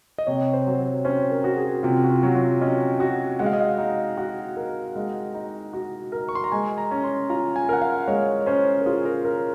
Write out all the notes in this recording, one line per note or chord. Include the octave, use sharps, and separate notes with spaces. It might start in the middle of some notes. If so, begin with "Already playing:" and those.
D#5
C3 C#5
C5
F#3
C#5
C#4 C5
A#4
F#4
G#4
C3 F4
F#4
F4
F#3
F4
C#4 D#5
F#4
G#3 F#5
F5
D#5
F5
D#4
F#4 F#5
A#4
G#3
D#4
F#4
A#4
C#6
C6
A#5
G#3 G#5
A#5
C#4
C6
F4 A#5
G#5
A#4 F#5
F5
G#3 C#5
C#5
C#4 C5
A#4
F4 G#4
A#4
G#4 A#4